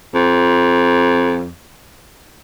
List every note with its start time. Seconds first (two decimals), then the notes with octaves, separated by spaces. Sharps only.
0.14 F2